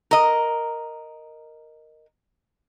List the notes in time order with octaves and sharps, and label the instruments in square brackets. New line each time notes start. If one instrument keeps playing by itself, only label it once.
[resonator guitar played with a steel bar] A#4 D#5